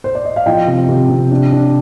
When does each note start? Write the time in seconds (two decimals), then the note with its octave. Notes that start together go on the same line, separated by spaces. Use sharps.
0.04 C5
0.15 D5
0.25 D#5
0.36 F5
0.46 F3 D#5 G5
0.67 C3
0.89 C3
1.09 C3
1.31 D4
1.52 D4